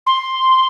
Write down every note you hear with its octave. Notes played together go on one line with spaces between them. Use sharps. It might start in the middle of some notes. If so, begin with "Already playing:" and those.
C6